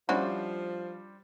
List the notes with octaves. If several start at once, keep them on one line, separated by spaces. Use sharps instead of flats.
F3 G3 C#4 D4 E4 F#4 C5